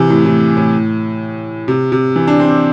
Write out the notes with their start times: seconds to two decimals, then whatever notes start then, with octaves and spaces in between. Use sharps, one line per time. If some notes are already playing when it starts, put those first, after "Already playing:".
Already playing: C3 E3
0.09 A2
0.25 A2
0.57 A2
1.68 C3
1.92 C3
2.16 E3
2.27 D4
2.40 C4